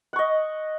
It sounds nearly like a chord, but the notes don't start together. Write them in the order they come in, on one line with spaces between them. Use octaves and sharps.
F#5 C#6 D#5